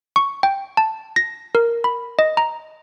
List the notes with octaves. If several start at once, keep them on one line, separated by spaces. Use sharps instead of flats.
C#6
G5
A5
A#6
A#4
B5
D#5
A#5